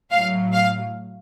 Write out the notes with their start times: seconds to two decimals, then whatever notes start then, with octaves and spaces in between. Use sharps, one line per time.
0.11 A2 F#3 F5
0.53 F5